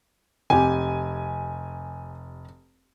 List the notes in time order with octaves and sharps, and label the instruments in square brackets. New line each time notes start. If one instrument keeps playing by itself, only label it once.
[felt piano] F1 G4 [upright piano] G#5